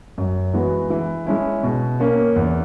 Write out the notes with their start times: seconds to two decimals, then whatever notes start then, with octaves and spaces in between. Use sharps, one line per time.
0.18 F#2
0.54 E3 G#3 B3 F#4
0.90 E3
1.27 G#3 C#4 E4
1.63 B2
2.00 A#3 C#4
2.36 E2